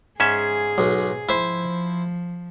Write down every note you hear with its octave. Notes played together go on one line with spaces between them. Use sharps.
G#2 C#4 G#4 E5
B1
F3 E4 C5